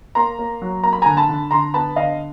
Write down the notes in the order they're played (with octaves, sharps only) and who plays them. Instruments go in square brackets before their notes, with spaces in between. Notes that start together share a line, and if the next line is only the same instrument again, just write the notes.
[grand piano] A#3 A#5 C6
A#3
F#3
A#3 A#5
B5
D3 G#5 A#5
A5 B5
D3
D3 A#5 C6
B3 A5 B5
D3 D#5 F5